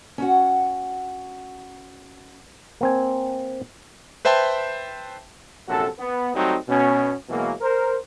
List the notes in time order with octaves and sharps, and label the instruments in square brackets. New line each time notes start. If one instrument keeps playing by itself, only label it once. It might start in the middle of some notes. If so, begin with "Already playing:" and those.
[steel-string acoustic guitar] C#4 F#4 F#5
[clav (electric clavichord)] A#3 C4 G#5
[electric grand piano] B4 C5 E5 G5 A5 C6
[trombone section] A#1 F#2 C3 F#4 A4
B3
F#3 G3 A3 C4 D#4 F#4
B2 C#4
B2 E3 F#3 G#3 A#3
A#4 C5